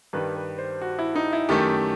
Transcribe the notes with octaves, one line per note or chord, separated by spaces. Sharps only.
G2 D#3 G3 B4
B4
C5
F#4
E4
D#4
E4
F#2 D#3 A3 G4